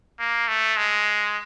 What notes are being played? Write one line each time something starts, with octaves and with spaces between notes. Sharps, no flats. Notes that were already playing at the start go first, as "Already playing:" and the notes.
A#3
A3
G#3